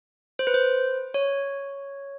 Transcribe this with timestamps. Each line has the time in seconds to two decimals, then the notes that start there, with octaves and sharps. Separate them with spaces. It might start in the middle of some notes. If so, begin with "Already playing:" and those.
0.39 C5
0.47 B4
0.54 C5
1.14 C#5